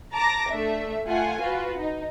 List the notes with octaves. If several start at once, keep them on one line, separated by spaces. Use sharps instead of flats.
A5 A#5 D6 A#6
A3 D4 E5
A3 F4 F#5 G#5
F4 F#4 B4
D#4